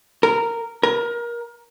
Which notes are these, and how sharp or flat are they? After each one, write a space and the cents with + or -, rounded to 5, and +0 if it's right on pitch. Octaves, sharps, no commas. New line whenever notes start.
A#4 -10
A#4 +25